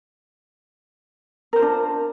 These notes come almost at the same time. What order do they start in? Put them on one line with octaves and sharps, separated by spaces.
A#4 C5 F4 D4